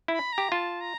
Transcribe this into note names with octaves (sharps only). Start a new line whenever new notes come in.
E4 B5
A#5
G4
F4 A5
A#5